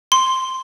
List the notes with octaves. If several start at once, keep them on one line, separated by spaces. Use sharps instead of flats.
C6